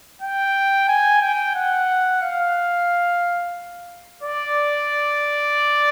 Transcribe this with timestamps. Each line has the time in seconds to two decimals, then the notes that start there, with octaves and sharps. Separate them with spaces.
0.22 G5
0.88 G#5
1.21 G5
1.55 F#5
2.22 F5
4.23 D5